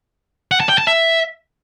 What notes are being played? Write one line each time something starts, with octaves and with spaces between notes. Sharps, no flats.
F#5
A5
G5
A5
E5